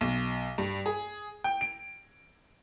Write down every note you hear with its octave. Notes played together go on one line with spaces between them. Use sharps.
B1
G2
G#4
G5
D7